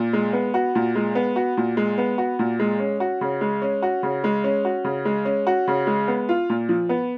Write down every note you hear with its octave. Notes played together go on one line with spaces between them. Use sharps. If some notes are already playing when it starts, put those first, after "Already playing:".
Already playing: A#2
G#3
B3
F#4
A#2
G#3
B3
F#4
A#2
G#3
B3
F#4
A#2
G#3
C#4
F#4
C#3
G#3
C#4
F#4
C#3
G#3
C#4
F#4
C#3
G#3
C#4
F#4
C#3
G#3
B3
F4
A#2
F3
B3